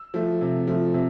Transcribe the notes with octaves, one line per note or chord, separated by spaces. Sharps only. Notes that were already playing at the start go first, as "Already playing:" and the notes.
Already playing: E6
F3 A3
C3
F3 A3
C3